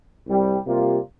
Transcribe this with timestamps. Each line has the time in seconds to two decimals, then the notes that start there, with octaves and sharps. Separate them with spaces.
0.27 C2 C3 G3
0.66 C3 G3 A#3 F4